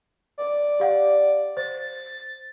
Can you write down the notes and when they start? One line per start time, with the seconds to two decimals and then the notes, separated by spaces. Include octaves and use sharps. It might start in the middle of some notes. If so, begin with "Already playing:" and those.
0.38 D5
0.80 G4 F5 F#5
1.57 C5 A6